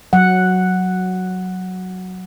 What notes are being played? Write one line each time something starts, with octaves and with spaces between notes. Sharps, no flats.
F#3 F#5